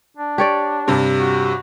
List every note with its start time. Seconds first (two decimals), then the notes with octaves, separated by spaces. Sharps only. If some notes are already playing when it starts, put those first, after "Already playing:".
0.17 D4
0.38 G4 C#5 D5
0.88 G2 C3
1.20 F#4